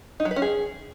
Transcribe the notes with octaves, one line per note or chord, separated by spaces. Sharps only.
D#4
F#3
B4
C#4
G#4